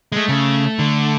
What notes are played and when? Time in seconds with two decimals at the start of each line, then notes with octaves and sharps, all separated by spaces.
0.12 G#3 A3
0.29 C#3
0.79 D3